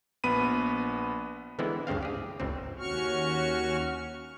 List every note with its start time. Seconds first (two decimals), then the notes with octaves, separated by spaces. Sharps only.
0.24 A#1 B3 B5 D#7
1.59 D3 E3 G#3 B3 C4 E4
1.87 D2 G2 C#3 C4 F5
2.03 G4 G#4
2.40 G1 C#2 C4
2.78 D#2 C#4 F#4 C#6 F6